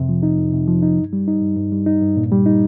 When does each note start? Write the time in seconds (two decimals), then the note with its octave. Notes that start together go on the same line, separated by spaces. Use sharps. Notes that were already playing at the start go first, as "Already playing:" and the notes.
Already playing: F2 C3
0.09 F3
0.23 D#4
0.38 F2
0.52 C3
0.68 F3
0.82 D#4
0.98 G2
1.13 G3
1.28 D#4
1.42 G2
1.56 G2
1.72 G3
1.86 D#4
2.02 G2
2.17 A#2
2.32 G3
2.46 D#4